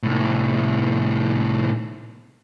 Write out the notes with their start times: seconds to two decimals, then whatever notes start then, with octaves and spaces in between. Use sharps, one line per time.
0.03 C2 A2